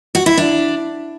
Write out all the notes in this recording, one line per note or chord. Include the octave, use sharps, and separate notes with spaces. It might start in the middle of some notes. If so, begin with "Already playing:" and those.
F#4
E4
D4